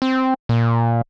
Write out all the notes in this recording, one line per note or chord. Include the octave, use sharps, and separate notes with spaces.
C4
A#2